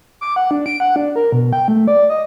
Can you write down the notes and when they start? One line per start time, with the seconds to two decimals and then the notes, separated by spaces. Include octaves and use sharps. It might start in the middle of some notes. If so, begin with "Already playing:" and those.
0.21 D6
0.36 F#5
0.51 D4
0.66 D7
0.80 F#5
0.96 D4
1.16 A#4
1.32 B2
1.53 G5
1.68 A3
1.88 D5
2.10 D#5